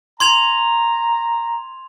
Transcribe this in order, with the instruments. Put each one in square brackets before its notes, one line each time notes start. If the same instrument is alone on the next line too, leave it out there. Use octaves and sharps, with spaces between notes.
[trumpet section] A#5 [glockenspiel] C6 G#6 F7